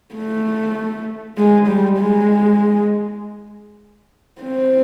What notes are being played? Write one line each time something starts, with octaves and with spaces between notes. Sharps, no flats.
A3
G#3
G3
G#3
C4